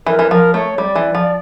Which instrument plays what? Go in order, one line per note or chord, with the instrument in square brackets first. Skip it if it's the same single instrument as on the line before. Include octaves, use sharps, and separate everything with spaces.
[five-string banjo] E3 [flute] A#4
[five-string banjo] E3
[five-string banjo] F3 [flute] A#4
[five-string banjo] A3 [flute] C#5
[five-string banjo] G3 [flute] D5
[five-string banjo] E3
F3